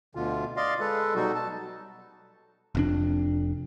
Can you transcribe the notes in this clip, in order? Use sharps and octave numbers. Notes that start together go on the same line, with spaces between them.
D2 B2 D3 F4
D5 D#5 F5 C6
G#3 A4 B4
B2 F#3 G3 D#4 F#4 A4
A5
F1 F2 D4